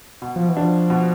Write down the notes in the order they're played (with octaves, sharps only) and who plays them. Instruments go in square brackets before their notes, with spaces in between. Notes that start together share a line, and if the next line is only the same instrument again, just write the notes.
[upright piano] B2
[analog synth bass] F3
E3
[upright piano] D4
[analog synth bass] F3
[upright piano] B2